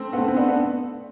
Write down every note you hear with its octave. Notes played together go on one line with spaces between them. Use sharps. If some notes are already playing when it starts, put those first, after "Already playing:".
Already playing: A3 C4
B3
A3 C4
C4
B3 D4
B3